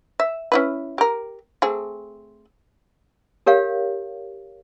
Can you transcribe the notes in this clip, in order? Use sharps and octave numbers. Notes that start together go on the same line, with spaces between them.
E5
C#4 E4 B4
G4 A#4
A3 C4 G#4
G4 A#4 C#5 F5